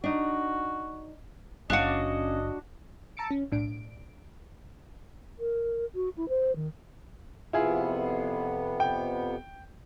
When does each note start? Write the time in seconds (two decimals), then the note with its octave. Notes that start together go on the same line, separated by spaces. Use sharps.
0.04 D4 D#4 F#4
1.70 F#1 C#4 D4 F#4 D#5 F5
3.17 A5 A#5 E6 A6 C#7 D7
3.31 C#4
3.52 B1 A2 D4 D7
5.39 A#4
5.95 F#4
6.17 E4
6.29 C5
6.56 D#3
7.53 F2 C3 B3 E4 F4 G#4
8.80 G5